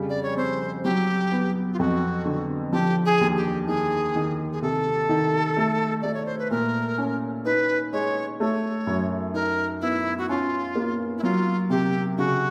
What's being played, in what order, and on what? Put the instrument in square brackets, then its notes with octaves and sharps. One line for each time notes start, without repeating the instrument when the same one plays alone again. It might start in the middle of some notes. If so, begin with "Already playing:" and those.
Already playing: [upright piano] F2 C#3 G3
[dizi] D5
C#5
[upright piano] C4 [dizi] C5
[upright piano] F#3 [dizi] G4
[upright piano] B3
[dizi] F4
[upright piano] F2 [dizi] F#4
[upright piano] D3
[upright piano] F3 [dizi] G4
[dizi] G#4
[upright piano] D#2
[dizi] G4
[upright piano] D#3 [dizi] G#4
[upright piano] D#3
[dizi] G#4
[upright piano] C3 [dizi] A4
[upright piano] D#3
A3
[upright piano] A3 [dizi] D5
[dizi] C#5
C5
B4
[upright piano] A#2 [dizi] A#4
[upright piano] C#4
[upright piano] D#4 [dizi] B4
[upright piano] G#3 [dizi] C#5
[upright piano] A3 [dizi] C#5
[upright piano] F#2
[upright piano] D#4 [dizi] A#4
[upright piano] B3 [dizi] E4
[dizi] F#4
[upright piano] C#4 [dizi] F4
[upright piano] A#3
[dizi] E4
[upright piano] F#3 [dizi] F4
[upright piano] C3 [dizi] G4
[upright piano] C#3 [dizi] F#4